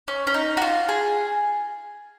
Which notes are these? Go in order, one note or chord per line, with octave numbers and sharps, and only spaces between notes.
C#4
C#4
D#4
F#4
F4
G#4